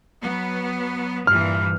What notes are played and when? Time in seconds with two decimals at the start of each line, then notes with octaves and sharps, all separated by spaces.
0.22 F#3 B3
1.27 G2 A#2 E3 F6